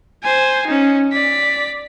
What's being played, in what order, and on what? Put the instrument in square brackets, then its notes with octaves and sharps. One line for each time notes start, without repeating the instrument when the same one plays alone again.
[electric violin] C5 G#5
C#4 D#4
D5 B6